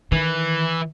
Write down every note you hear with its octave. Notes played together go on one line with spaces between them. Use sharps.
D#3 E3